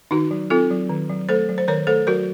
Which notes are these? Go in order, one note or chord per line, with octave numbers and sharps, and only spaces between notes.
D#3 D#4 F#4
F#3
C4 F4 A4
F#3
D#3
F#3
A3 A4 C5
F#3
C5
D#3 A#4 C#5
A3 A4 C5
F#3 F#4 A#4